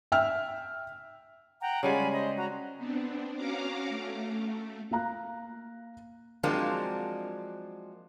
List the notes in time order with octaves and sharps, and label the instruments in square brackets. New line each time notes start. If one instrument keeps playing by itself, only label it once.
[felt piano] E5 G5 E6 F6
[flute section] F#5 G5 A#5
[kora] C#3 G3 G#3 [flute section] F4 G#5 B5
[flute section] C5 D#5
F#4 A#5
[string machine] B3 C4 D4
C#4 F#4 F5 A#5 D6
A3
[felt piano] A#3 F5 A#5 F#6
[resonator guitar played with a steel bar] F3 F#3 G#3 A#3 C4 D4